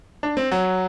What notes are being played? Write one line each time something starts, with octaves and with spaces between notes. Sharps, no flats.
D4
C4
F#3